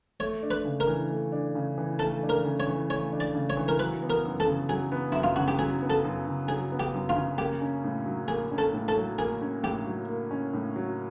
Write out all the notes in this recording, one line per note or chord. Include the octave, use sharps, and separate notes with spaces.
A3 C#5
D4
B4
C#3
A#4
E3
A3
D4
C#3
E3
A3 A4
D4
A#4
C#3
C#5
E3
A3 C#5
D4
D5
C#3
C#5
E3
A#4
F#3 B4
B3
A#4
F#2
A4
C#3
F#3 G#4
B3
F#2 E4
F4
C#3 F#4
G4
F#3 G#4
B3
A4
F#2
C#3
F#3 G#4
B3
G4
F#2
F4
C#3
A#3 G4
C#4
A2
F#3
A#3 G#4
C#4
A4
A2
A4
F#3
A#3 G#4
C#4
A2 G4
F#3
A#3
C#4
A2
F#3